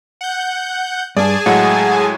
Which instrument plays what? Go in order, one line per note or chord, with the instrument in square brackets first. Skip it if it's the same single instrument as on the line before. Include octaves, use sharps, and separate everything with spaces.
[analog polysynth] F#5 G6
[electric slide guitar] G2 [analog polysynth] G#4 G#5 A5 [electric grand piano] D5
[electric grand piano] A2 F#3 G#3 [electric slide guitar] F#5